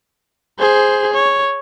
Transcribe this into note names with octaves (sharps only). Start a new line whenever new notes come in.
G#4 C5
C#5